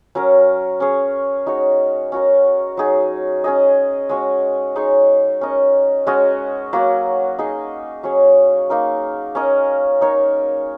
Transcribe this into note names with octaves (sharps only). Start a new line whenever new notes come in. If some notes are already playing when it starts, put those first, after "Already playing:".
F#3 C#4 A#4
C#4 G#4 C#5
G#3 D#4 F#4 C#5
C#4 F#4 A#4
F#3 D#4 G#4
C#4 G#4 D#5
G#3 C#4 F#4
G#3 D#4 G#4 C#5
C#4 A#4 D#5
G#3 C#4 F#4 D#5
F#3 A#3 F#4
D#4 G#4 D#5
F#3 C#4 G#4 C#5
A#3 D#4 A#4
C#4 A#4 D#5
D#4 A#4 C#5